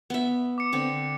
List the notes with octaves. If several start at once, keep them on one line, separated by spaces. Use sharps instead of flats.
B3 E5
D6 C#7
D3 C4